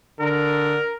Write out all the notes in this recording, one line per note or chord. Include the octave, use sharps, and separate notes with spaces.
D3 A#4